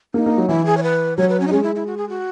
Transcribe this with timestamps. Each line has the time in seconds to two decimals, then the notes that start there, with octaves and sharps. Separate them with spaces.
0.14 A#3 D#4
0.26 A#3
0.38 F#3
0.49 E3 E4
0.65 G#4
0.77 C#5
0.83 B4
1.17 F#3 C#5
1.29 B4
1.40 C#4
1.47 D#4
1.51 G#3 C#4
1.63 E4
1.75 E4
1.87 F#4
1.97 G#4
2.09 F#4